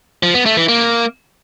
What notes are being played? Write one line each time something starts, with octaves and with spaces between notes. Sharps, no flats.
F3
B3
A3
E3
A#3